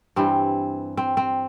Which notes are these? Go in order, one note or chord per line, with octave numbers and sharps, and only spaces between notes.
G2 E3 G3 C4
C4
C4